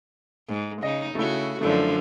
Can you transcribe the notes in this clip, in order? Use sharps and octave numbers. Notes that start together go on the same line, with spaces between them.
G#2
C#3 D#4 D#5
C#3 A3 E4 F#4
F#2 D3 F3 A3 D4 E4